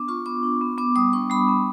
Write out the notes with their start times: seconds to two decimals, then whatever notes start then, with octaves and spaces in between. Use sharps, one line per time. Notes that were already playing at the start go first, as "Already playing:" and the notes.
Already playing: B3 D4 D6
0.08 F4 C#6
0.26 B3 D6
0.43 D4
0.61 B3
0.78 B3 D6
0.96 G3 D#6
1.13 D4 C#6
1.30 G3 B5
1.48 B3